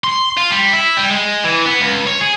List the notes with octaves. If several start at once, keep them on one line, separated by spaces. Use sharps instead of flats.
C6
F4
G3
E4
G3
G#3
E3
B3
C#2
C#5
G#4